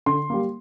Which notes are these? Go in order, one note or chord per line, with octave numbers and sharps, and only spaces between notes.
D3 C6
G3 A#3